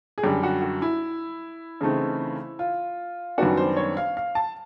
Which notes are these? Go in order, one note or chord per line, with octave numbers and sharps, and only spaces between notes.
G#4
F#2 D3 G3 G4
F#4
F#4
E4
C#3 E3 A3 C4 D#4
F4
F#2 D#3 G3 B3 D4 F#4
C5
C#5
F5
F5
A5